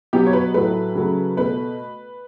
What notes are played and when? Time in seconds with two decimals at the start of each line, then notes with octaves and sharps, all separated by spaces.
0.13 B2 F#3 B3 G4
0.27 C#5
0.33 B4
0.54 A2 F#3 A3 B4
0.95 C#3 F#3 A3
1.37 B2 A3 B4